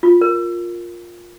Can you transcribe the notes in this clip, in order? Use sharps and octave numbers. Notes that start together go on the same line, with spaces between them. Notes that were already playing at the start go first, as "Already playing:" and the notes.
F4
A#4